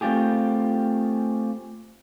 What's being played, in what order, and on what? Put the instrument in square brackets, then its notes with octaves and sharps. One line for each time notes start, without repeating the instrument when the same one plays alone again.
[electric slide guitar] A3 C4 F4 G4 G#4